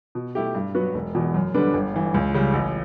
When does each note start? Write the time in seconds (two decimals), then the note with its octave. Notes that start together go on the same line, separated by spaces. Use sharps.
0.15 B2
0.35 A3 E4 G4
0.55 G2
0.75 F#3 B3 F#4
0.94 E1
1.15 E2 B2
1.34 F#2
1.54 D3 G3 B3 D4
1.74 G1
1.94 G2 E3
2.14 C#2
2.34 C#3 G3
2.53 A1